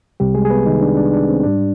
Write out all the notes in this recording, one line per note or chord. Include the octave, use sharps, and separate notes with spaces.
C2 C3 G3 G4
G#3 G#4
G#4
B3 B4
D#3 D#4
D4
D4
D4
C4
G#2 G3 D4